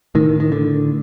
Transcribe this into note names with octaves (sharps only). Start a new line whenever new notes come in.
A2 D#3
D#3
D3